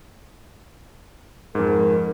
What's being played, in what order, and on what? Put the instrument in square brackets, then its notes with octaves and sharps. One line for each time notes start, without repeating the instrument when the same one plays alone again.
[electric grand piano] F2 G#2 [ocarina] A#4